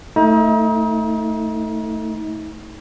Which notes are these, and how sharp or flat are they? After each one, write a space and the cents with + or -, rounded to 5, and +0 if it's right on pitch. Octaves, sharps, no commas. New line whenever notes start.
A3 +15 D#4 +35